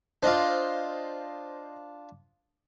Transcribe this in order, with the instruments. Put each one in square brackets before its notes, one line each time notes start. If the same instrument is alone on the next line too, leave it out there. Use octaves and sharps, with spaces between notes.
[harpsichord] D4 F4 [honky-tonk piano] C5 D#5 F5